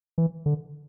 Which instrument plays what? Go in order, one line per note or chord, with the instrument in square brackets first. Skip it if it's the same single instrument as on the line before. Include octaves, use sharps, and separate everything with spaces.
[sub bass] E3
D3